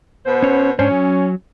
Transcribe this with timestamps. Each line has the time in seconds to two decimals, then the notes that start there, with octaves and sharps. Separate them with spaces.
0.26 B2 B3 C5
0.43 C#4 C#5
0.79 G#2 C#4 D4 C5
0.91 F#3